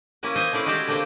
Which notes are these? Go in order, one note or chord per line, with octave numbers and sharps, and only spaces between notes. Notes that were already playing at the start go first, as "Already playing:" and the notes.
A#3 C#4 E4 B4
C5 D#5 F5 G#5
A3 C#4 E4 D5 F5
G#3 E4 F#4 G4 F5 G5
D3 A#3 C4 B4 G5 A5